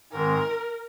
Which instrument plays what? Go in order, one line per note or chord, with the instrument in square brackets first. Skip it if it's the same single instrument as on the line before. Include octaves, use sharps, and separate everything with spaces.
[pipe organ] G#2 D#3 G#3 C4 [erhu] A#4